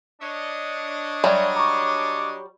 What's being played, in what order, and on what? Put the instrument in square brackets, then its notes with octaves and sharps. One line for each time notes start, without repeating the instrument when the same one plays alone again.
[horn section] D4 C#5 D#5
[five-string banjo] F#3 G3 [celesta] D5 E5 C6
[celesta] A#5 C#6 [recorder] D6